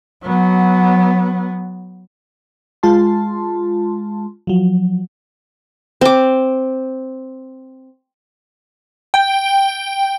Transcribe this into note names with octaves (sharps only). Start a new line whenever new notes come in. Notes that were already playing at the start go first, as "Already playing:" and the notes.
F#3 B3
G#3 F4 A5 C6
F3 F#3
C4 D6
G5